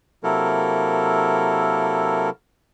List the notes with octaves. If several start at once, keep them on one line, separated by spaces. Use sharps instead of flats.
C3 F#3 A#3 E4 A4 A#4